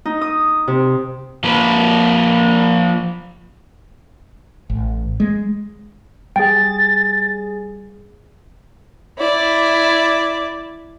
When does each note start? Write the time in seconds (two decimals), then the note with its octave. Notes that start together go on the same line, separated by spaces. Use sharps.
0.05 D#4
0.21 D#6
0.68 C3
1.44 F3 A#3 B4
4.70 A1
5.20 G#3
6.36 G3 G#4 G5 A6
9.18 E4 D5